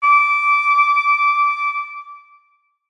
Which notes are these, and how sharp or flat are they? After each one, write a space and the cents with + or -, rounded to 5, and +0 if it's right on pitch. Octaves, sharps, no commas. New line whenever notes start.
D6 -15